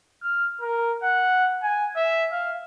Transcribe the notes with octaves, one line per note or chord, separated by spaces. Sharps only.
F6
A#4
F#5
G#5
E5
F5